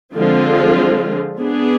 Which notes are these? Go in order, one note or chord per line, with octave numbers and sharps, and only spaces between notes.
D3 F3 G#3 C4 F4
B3 D4 G#4